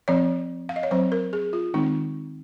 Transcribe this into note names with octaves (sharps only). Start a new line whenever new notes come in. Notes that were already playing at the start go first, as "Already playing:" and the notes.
F3 C4 C#5
F5
D#5
C#5
F#3 C4 C5
A#4
G#4
F4
D#3 G#3 C4 D#4